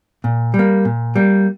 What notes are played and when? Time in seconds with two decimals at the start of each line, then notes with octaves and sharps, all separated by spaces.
0.24 A#2
0.54 G3
0.59 A#3
0.85 A#2
1.16 G3 A#3